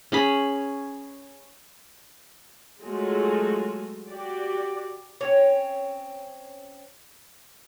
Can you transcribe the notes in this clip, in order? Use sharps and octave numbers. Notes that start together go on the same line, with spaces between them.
C#4 G#4 B5
F#3 G#3 A3 F4 F#4 G#4
F#4 G4 D5
C4 C#4 C#5